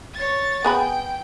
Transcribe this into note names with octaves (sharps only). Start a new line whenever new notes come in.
C#5 A6
B3 G#4 G5 B5